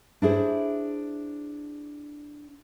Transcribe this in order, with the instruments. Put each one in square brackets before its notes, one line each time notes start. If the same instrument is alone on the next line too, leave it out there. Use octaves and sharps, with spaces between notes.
[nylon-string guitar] D4 E4 G#4 C5